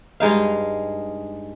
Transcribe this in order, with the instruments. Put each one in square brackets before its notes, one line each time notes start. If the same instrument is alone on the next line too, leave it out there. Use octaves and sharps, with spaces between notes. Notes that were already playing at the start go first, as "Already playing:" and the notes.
[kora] G2 G#3 D#4 F5